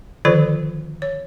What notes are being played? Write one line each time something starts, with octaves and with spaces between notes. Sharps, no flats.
D3 D#3 F3 F4 A4 C5
C#5